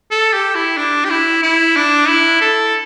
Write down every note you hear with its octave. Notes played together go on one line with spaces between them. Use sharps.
A4
G4
E4
D4
G4
E4
E4
D4
E4
A4